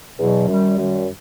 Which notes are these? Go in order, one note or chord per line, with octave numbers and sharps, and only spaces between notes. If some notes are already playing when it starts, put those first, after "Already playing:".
E2 B2 F#3
F#2 D#3 G3
F#2 D#3 G3